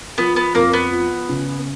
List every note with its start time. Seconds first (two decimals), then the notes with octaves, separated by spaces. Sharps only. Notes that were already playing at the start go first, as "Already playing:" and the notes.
0.18 F3 B3
0.36 B3
0.55 F2 A#3
0.73 B3
0.91 F3
1.29 C#3